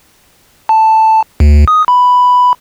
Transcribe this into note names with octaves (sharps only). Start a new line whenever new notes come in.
A5
D2
D#6
B5